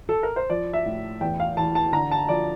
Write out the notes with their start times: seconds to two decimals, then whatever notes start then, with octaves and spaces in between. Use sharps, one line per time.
0.09 A4
0.23 A#4
0.36 C5
0.50 F3 D5
0.73 E5
0.86 A2
1.21 E2 G5
1.40 F5
1.57 E3 A5
1.75 A5
1.93 D3 A#5
2.11 A5
2.29 F3 D5